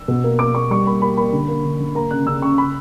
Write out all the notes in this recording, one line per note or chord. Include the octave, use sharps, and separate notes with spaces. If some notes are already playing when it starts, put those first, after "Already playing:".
Already playing: E6
B2
A#3
A#3 D6
A#3 C#6
G3 C#6
A#3 B5
A#3 B5
A#3 B5
D3
A#3
D3
D3
A#3 A#5
C#3 F#6
C#3 E6
C#3 C#6
C#3 B5